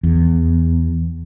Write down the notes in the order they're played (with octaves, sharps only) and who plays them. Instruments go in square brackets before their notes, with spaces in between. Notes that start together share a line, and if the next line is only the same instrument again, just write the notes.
[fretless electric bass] E2